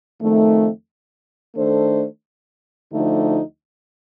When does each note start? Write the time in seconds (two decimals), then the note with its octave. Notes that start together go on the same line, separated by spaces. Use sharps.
0.19 F2 D#3 A3
1.56 D#3 A3 D4 A4 C5
2.92 D2 D3 F3 A3 D#4